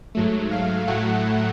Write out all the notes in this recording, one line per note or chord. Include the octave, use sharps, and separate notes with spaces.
G#2 F#3 A3
F5
A2 F#3 A3 F#5